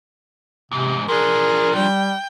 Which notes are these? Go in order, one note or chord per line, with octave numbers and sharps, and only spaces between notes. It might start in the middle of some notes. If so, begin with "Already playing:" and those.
E2 G#2 C3
F3 D4 G#4 A#4
G3 G5